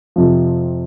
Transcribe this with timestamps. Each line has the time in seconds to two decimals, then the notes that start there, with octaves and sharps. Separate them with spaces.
0.16 F2 C3 F3